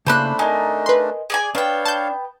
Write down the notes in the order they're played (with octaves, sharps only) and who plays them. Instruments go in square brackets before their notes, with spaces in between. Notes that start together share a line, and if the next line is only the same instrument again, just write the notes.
[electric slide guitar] C#3 A#3 [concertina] A3 D4 [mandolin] C5 B5 F#6
[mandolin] D#4 [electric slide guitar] A#4 D#5 G#5
[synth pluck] B4 C6
[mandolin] G#4 D5 G#5
[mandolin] B3 G5 [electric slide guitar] D4 [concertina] C#5 F5
[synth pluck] A5 G6